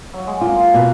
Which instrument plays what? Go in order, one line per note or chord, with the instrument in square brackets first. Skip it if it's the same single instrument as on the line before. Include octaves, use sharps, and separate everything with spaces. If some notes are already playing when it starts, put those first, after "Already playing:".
[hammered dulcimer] F#3
G#3
[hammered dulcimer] A#3 [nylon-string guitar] F4
[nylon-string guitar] B2